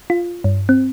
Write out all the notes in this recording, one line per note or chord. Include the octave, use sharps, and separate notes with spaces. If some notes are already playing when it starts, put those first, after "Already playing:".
F4
G2
C4